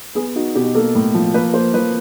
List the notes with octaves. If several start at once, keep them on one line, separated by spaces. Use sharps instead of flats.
B3 G#4
D#4 F#4
B2 G4
A#3 A4
A2
F3
A#3 B4
A#3 C5
F3 B4